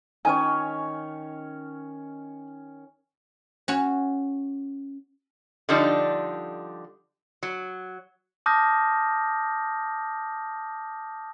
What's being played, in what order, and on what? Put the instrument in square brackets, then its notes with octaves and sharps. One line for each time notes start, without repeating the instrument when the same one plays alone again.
[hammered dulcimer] D#3 C#4 C#5 [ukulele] D#4 G#5
[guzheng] C#4 F#4 C#5
[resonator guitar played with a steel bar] D3 F3 G3 D4 D#4
F#3
[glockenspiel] A5 D6 D#6 F6 G6 A#6